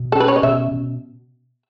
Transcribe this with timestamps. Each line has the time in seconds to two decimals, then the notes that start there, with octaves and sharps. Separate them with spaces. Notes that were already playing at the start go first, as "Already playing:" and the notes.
Already playing: B2
0.12 A4
0.15 C#4
0.20 B4
0.28 C#5
0.36 D#5
0.43 B2 E5
0.71 B2